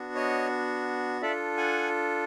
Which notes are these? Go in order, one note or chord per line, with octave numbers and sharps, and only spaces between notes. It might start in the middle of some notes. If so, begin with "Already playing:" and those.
Already playing: B3 D4 F#4
C#5 D#5
D4 F4 A4 D5 E5
F#5 G#5